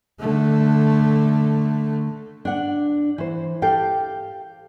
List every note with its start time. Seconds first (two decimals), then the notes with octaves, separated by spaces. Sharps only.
0.20 D3 A3
2.45 D4 F#5
3.18 E3 C5
3.62 G4 A4 F5 G5